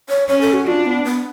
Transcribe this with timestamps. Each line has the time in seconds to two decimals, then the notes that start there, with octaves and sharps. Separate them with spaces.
0.09 C#5
0.28 C#4 C#5
0.41 A4
0.53 F#4
0.67 D4 F4
0.86 B3
1.05 B3